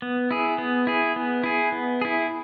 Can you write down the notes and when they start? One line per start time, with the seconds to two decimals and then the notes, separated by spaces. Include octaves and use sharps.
0.02 B3
0.31 E4 G#4
0.58 B3
0.87 E4 G#4
1.16 B3
1.44 E4 G#4
1.72 B3
2.01 E4 G#4